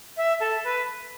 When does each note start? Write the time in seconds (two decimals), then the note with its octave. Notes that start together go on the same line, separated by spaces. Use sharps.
0.17 E5
0.40 A4
0.64 B4